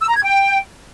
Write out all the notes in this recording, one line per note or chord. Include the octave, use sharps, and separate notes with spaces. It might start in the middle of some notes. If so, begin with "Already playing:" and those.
E6
A#5
G#6
G5